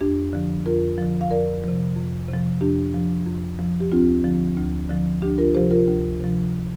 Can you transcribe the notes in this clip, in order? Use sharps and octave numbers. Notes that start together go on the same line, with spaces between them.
F2 D4 G4
D3 F3
F2 F4 A#4
D3 F3
F5
F2 A#4 D5
C3 F3
F2
C3
F3
F2 D4 G4
F3
F2
F3
G4
D2 C4 F4
D3 F3
D2
D3 F3
D2 D4 G4
F4 A#4
C3 F3 G4 C5
F4 A#4
D2
C3 F3